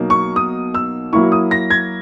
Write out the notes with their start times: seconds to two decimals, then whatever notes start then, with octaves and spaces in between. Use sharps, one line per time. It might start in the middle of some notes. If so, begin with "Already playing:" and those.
Already playing: B2 F#3 A#3 D#4
0.10 C#6
0.36 D#6
0.74 E6
1.13 F#3 A#3 E4 C#6
1.32 D#6
1.51 A#6
1.70 G#6